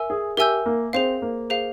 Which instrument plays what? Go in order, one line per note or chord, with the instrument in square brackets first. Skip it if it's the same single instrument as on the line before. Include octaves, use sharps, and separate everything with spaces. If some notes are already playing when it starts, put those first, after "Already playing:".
Already playing: [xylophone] A#4 E5 G#5 E6
[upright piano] G#4
[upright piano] G4 [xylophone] A#4 E5 G#5 E6 G6
[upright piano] A#3
[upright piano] C4 [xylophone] G#4 C5 F5
[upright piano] A#3
[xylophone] G#4 C5 F5